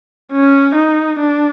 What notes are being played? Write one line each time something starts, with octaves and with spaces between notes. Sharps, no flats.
C#4
D#4
D4